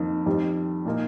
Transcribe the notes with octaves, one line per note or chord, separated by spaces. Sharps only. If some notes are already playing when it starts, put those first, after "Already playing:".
Already playing: F2 D#3 A#3 D#4
F2 D#3 G3
A#2 A#3 D#4